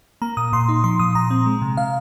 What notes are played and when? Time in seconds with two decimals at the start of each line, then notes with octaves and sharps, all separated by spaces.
0.22 A#3 A#5
0.37 A#2 D#6
0.53 A#2 C6
0.69 D#4
0.84 F3 C6
0.99 A#2 D#6
1.15 A#2 A#5
1.30 C4
1.46 G#3
1.62 C3
1.77 C3 F5